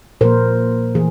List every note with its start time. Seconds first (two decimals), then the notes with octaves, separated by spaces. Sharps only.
0.21 A#2 F3 A#3 A#4 C5
0.95 E3 A3 G#4